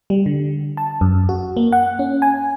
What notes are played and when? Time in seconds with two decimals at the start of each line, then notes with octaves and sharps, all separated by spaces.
0.10 G3
0.26 D3
0.77 A5
1.01 F#2
1.29 F#4
1.57 A#3
1.72 F#5
1.99 C#4
2.22 G#5